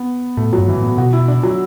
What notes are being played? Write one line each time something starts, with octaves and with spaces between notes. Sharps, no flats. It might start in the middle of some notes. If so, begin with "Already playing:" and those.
Already playing: B3
A2 A3
F#3
G2
E3
A2 B3
B2 F#4
E4
D4
F#3